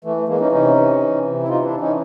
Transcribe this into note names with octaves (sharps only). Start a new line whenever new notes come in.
E3 A3
A3
E3 G#3 A#3
C#4 D#4
C3 C#4 D#4
E3
E3
C3
E4
E3 D#4 F4
D4 E4
E3
C#4 D#4